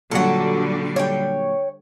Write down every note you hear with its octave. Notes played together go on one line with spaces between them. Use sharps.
A#2 D3 F#3 G3 F#4 A4
C#5 G5